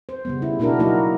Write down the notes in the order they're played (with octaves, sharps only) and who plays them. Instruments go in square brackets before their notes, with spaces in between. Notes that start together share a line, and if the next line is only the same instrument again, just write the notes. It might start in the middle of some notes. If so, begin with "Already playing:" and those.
[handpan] C5
C#3 G3 B3
E4
B2 A#3 D4 E4 F#4 A#4
F#3 A#3 D#4 E4 F#4 A#4